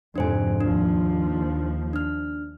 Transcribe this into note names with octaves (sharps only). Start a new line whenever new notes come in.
F2 G#2 C3 D4 C5 G#5
D#2 F3 D4
D4 F6